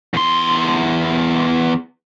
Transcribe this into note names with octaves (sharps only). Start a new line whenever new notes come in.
E2 C6